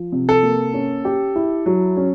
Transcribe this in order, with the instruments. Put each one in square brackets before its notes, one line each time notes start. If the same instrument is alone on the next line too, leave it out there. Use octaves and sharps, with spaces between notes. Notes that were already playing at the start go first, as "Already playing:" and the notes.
Already playing: [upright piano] F3
C3
[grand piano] A4
[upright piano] A#3
C#4
G4
E4
F#3
C#4